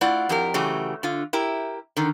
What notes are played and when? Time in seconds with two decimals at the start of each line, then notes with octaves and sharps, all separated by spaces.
0.01 A3 E4 F4 D5 F#5
0.29 F2 G4 A#4
0.54 C#3 E3 F#3 A3 G4
1.03 D3 F4
1.33 E4 G4 A#4
1.97 D3 D#3